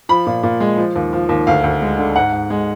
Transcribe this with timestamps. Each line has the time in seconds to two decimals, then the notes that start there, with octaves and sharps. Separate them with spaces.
0.09 F3 B5
0.27 A#2
0.43 A#2
0.60 G#3
0.77 F3
0.96 D#2
1.13 F3
1.29 D#2
1.47 D2 F5
1.64 D2
1.82 G#3
1.99 D3
2.16 G#2 F#5
2.33 G#2
2.50 G#3